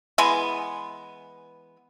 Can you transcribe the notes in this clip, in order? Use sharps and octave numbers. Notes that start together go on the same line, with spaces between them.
E3 G#3 B3 G#5